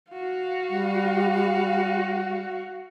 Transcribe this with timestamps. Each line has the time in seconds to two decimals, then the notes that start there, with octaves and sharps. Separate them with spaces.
0.11 F#4 F5
0.70 G3